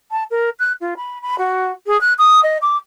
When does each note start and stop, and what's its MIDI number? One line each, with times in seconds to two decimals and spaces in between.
0.12 0.24 81
0.31 0.50 70
0.59 0.73 90
0.81 0.94 65
0.97 1.22 83
1.22 1.36 83
1.38 1.72 66
1.87 2.00 68
2.01 2.14 90
2.18 2.40 87
2.43 2.58 75
2.62 2.77 86